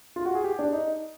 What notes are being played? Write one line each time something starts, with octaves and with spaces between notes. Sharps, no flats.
F4
F#4
G#4
G4
D4
D#4